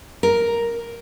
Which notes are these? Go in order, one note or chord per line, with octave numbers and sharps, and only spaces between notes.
A#4